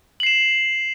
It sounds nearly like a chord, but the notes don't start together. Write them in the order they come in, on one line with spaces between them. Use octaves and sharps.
F#7 C7 E7